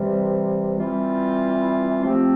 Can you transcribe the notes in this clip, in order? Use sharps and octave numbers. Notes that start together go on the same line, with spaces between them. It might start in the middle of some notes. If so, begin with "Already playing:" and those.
Already playing: C3 E3 G3
E3 G3 C4 F4
F3 A3 C4 G4